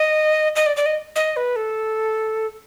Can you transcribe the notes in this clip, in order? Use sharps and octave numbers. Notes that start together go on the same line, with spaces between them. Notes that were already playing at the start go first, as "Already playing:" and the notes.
Already playing: D#5
D#5
D5
D5
D#5
D#5
B4
A4